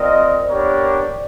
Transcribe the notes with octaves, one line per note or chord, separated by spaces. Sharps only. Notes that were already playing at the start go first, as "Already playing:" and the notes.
Already playing: C4 F4 A#4 C5 D5 D#5
B3 D4 G4 A#4 C#5